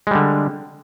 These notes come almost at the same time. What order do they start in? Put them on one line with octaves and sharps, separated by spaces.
G#3 G3 D3